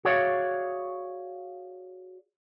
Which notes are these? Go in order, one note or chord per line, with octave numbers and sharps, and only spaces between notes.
F#4 G#4 C#5 D5 E5 F5